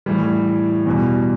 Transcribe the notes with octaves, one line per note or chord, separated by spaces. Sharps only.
A2 E3 G3
E2 B2 G3